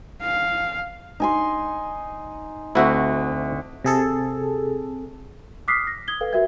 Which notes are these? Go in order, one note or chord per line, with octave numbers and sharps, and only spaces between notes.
F5
D#4 G#5 C6
D2 C4 E4 F#4 E5
C3 G#4 A4
D6 D#6 F6 F#6 B6 C7
A#6
D#6 G#6 G7
A4 B4 F5 G5
F#4 A#4 E5 G5 G#6